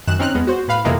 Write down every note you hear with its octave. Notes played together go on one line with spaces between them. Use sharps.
F#2 D#3 F#6 E7
C4 C#4 D#4 F6 F#6
E2 G#3 B3
F#4 C5
A2 B4 F5 B5
F2 C3 D#3 E3 G#3 A#3